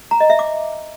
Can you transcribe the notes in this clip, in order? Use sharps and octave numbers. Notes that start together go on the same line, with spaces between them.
A#5
D#5
E5
D6